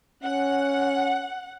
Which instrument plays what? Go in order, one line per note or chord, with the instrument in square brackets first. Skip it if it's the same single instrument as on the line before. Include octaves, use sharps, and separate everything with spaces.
[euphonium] C#4 [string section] F#5